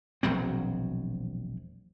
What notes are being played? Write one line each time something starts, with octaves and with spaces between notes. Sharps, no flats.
E1 A#1 F#3 C4